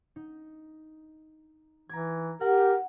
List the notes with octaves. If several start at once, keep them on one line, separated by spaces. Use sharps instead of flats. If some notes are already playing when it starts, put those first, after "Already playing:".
D#4
E3 A#5 D6 G#6
G4 A#4 F#5